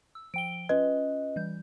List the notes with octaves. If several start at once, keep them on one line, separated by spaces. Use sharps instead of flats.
E6
F3 G5 D7 G7
C#4 F4 B4 D#5
E3 G3 G6